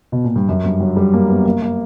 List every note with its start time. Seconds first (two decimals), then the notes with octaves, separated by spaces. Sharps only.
0.12 B2
0.24 A#2
0.36 G2
0.48 F#2
0.64 G2
0.80 F#3
0.96 G3
1.13 A#3
1.29 B3
1.46 A#3
1.62 A#3